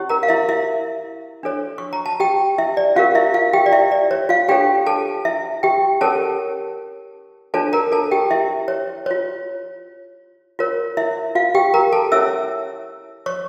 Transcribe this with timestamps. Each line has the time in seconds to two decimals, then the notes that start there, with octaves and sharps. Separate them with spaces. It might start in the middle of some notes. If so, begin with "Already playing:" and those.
Already playing: C#4 E4 G4 C#5
0.09 A#4 A#5
0.23 F5
0.29 E4 E5
0.49 E4 E5
1.43 D4 A4 C#5
1.78 C#6
1.93 A#5
2.06 A5
2.20 G4 G5
2.58 E4 E5
2.77 D5
2.96 C#4 F4 G4 A#4 F5
3.15 E4 E5
3.34 F4 F5
3.53 G4 G5
3.66 D5
3.72 E4 E5
3.92 D5
4.11 C#5
4.29 F4 F5
4.48 D4 F4 G4 A4 C#5 G5
4.86 A4 A5
5.25 E4 E5
5.63 G4 G5
6.01 C#4 G4 A4 A#4 C#5 A5
7.54 D4 F4 A4 C#5 A5
7.73 A#4 A#5
7.92 A4 A5
8.11 G4 G5
8.31 E4 E5
8.68 C#5
9.06 F4 C#5
10.59 F4 A#4 C#5
10.97 E4 E5
11.35 F4 F5
11.55 G4 G5
11.74 A#4 A#5
11.92 A4 A5
12.12 C#4 E4 A4 C#5 E5 E6
13.26 C#5 C#6